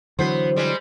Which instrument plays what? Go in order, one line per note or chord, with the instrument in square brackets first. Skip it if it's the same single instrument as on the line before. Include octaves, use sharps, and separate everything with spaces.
[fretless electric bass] D3 E3 F#3 [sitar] B3 C5
[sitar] G3 G#3